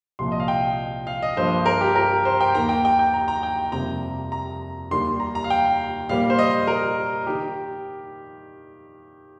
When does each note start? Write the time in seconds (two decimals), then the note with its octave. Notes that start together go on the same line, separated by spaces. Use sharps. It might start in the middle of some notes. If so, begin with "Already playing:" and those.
0.19 C2 A#2 F3 C6
0.32 D#5
0.40 F5
0.48 G5
1.07 F5
1.23 D#5
1.37 G2 F3 A#3 C5
1.66 A#4
1.81 G4
1.96 A#4
2.25 C5
2.41 G5
2.55 D#2 D#3 A#3 A#5
2.69 G5
2.85 G5
2.99 G5
3.14 A#5
3.28 A#5
3.43 G5
3.72 F2 C3 G3 A#3 A#5
4.32 A#5
4.91 D#2 D#3 G3 A#3 C6
5.20 A#5
5.35 A#5
5.44 F5
5.50 G5
6.09 A#2 G3 A#3 F5
6.30 C5
6.39 D#5
6.67 A#4
7.27 D#3 G4